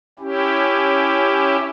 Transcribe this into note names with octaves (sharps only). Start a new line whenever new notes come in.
C#4 E4 G4